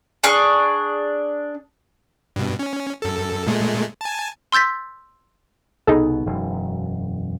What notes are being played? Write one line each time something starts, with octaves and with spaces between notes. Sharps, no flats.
D4 G#4 C#6 F#6
G2 B2
C#4
F#2 A4
A#2 G#3 A3
G#5 A5
C6 E6 G6 A6 B6
C2 B2 B3 D#4 G#4 A4
E1 F#2